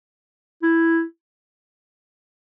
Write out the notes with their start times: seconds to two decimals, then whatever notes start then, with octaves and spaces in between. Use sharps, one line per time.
0.63 E4